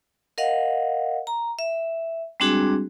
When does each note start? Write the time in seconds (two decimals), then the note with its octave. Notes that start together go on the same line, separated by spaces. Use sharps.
0.38 A#4 D#5 F5 F#5
1.27 A#5
1.59 E5
2.40 G3 G#3 C4 D4 F#4 G#4